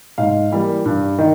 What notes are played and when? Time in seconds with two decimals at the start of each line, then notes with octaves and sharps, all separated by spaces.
0.18 G#2 F5
0.51 E3 G3 A#3
0.85 G2
1.18 D#3